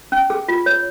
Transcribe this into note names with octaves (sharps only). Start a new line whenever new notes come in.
C#4
G#4
F4
C#5